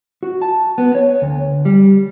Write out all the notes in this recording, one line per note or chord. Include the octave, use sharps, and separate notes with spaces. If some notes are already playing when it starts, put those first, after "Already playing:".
F#4
A5
B3
C#5
D2
G3